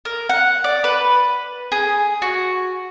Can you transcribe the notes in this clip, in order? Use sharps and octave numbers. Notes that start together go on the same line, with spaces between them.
A#4
F#5
D5
B4
G#4
F#4